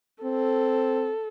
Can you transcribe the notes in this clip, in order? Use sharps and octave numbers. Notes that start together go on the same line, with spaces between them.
C4 A4